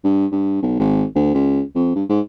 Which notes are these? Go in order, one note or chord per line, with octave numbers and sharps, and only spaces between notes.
G2
G2
B1
G#1
D2
C#2
F2
G2
G#2